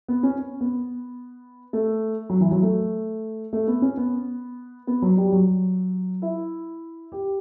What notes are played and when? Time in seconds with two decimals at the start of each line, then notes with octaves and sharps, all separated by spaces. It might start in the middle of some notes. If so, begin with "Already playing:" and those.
0.08 B3
0.23 C#4
0.61 B3
1.73 A3
2.30 F#3
2.41 E3
2.51 F#3
2.62 A3
3.53 A3
3.67 B3
3.82 C#4
3.98 B3
4.87 B3
5.02 F#3
5.17 G3
5.32 F#3
6.22 E4
7.12 G4